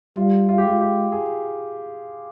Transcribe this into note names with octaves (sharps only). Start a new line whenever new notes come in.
G3 F4
F4
G4
G#3 F4
G4
G#4